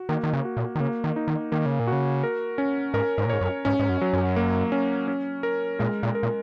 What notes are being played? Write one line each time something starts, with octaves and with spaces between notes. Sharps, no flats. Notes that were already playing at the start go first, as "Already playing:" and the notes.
Already playing: F#4
D#3 A#3
D#3
C#3
F#4
A#2
D#3
C#3 A#3
D#3
D#4
D#3
D#3 A#3
C#3
A#2
C#3 F#4
A#4
C#4
G#2 A#4
G#2
A#2
G#2 C#5
F#2
G#2 C#4
G#2
F#2
F#3
F#2
A#3
C#4
C#4
A#4
A#2 G#3
A#2
A#4
A#2